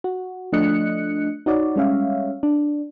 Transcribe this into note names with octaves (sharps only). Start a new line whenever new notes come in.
F#4
F3 A3 D4 D#5 F#6 C#7
D#4 F#4 C#5 D5
G3 G#3 C#4 C#5 E5 F5
D4